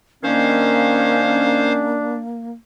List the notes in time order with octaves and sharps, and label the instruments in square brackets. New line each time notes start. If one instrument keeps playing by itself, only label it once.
[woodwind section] D#3 C#4 [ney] A#3 [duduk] D4 [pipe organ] C5 F5